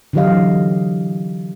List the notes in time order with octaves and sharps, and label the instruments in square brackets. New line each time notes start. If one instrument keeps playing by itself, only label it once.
[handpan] D3 E3 F#3 G4 D#5 F5